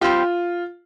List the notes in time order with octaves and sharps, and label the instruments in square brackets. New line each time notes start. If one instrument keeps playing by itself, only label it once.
[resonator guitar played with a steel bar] G3 C4 G4 [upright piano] F4